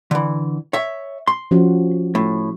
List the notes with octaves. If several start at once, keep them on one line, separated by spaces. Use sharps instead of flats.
D3 E3
C#5 E5
C6
F3 C#4 F#4
A2